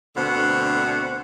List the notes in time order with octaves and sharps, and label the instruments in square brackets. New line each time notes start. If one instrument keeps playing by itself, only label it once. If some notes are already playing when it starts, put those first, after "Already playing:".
[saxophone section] D2 B2 D3 C4 C5 F#5